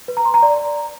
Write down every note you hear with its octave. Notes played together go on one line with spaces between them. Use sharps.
B4
A#5
C6
A#5
D5